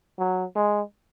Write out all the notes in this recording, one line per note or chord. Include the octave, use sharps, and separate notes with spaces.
F#3
G#3